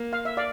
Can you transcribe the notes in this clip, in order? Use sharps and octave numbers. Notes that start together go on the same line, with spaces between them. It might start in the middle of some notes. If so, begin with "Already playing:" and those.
Already playing: A#3
F5
E5
D5 F5